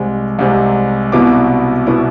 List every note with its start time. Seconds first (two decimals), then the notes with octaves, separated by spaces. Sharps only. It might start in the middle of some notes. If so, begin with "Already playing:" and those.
Already playing: C2 C3 G#3
0.39 C2 C3 G#3
1.12 C2 B2 B3 E4 D6
1.87 B2 B3 E4